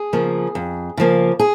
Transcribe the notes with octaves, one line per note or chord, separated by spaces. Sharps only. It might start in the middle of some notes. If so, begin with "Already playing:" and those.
Already playing: G#4
C#3 F3 A#3
F2
C#3 F3 A#3
G#4